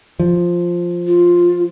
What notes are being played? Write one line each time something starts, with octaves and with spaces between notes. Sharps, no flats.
F3
F4